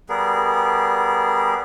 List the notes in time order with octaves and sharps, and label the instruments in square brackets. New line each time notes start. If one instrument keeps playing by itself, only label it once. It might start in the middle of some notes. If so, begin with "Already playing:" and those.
[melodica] G3 B3 G#4 A#4